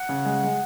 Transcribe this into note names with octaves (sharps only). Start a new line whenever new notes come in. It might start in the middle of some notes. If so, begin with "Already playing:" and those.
Already playing: F#5
C#3
G#3
G#3